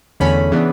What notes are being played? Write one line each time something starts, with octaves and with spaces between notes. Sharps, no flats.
E2 D3 A3 C#4 B5
C#3 E3 B3 D4